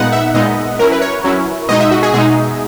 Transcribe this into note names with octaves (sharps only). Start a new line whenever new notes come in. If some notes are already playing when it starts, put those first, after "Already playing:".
Already playing: A#2 G#3 B3 D#4 F#5
E5
A#2 G#3 B3 D#4 D#5
F#3 C#4 E4 A#4
B4
C#5
F#3 C#4 E4
B2 G#3 D#4 D#5
E5
F#4
G#4
B2 G#3 D#4 G#4